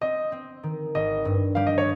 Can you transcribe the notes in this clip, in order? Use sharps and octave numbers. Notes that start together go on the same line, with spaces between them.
C4 D#5
C4
D#3
G#1 D#5
G2
G3 F5
D#5
C#5